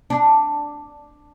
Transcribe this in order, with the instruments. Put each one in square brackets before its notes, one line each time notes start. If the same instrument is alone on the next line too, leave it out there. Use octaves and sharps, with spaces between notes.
[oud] D4